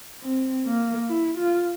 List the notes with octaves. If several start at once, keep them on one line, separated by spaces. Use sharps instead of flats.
C4
A#3
E4
F4